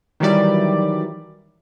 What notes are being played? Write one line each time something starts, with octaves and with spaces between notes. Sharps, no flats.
D#3 E3 F#3 G3 E4 D5